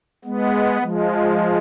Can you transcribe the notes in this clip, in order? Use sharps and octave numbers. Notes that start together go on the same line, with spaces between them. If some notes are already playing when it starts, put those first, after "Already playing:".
G#3 B3
F3 G#3